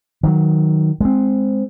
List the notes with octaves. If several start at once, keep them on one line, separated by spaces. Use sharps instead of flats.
D#3 F#3
G#3 C4